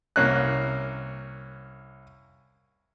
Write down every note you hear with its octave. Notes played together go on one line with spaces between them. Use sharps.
C2 A#3 C#4 F#6